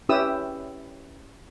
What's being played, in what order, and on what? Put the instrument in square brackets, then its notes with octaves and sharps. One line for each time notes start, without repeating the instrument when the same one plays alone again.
[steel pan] C#4 E4 G4 B4 D#6 E6